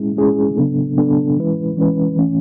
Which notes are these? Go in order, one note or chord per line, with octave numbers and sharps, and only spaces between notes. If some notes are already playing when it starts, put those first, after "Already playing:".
Already playing: G#3 C#4 E4 G#4
G#3 C#4 E4 G#4
C#3 F#3 B3 D4 A4
C#3 F#3 B3 D4 A4
E3 G#3 C#4 E4 B4
E3 G#3 C#4 E4 B4
E3 A3 C#4